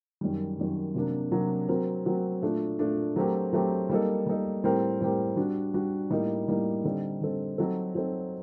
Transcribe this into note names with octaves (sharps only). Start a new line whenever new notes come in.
F#2 D#3 G3
F#2 D#3 G3
C3 F#3 A#3 D4
C3 F#3 A#3 D4
F#3 C4 F#4 A#4
F#3 C4 F#4 A#4
A#2 A3 D4
A#2 A3 D4
F#3 A3 C4 G4 A#4
F#3 A3 C4 G4 A#4
G3 A#3 D#4 A4
G3 A#3 D#4 A4
A2 G3 C4 G4 A#4
A2 G3 C4 G4 A#4
G3 D4 F#4
G3 D4 F#4
A2 G3 A#3 D#4
A2 G3 A#3 D#4
D3 G3 C4 D#4 A4
D3 G3 C4 D#4 A4
F#3 C4 D#4 A4
F#3 C4 D#4 A4